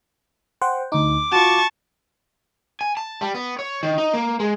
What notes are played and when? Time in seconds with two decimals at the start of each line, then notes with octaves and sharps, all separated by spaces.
0.62 C5 F#5 G5
0.92 D2 D#4 D6
1.32 F4 F#4 A5 C#6
2.81 G#5
2.97 A5
3.21 G3
3.35 B3
3.59 C#5
3.83 D#3
3.98 D#4
4.13 A#3
4.40 G#3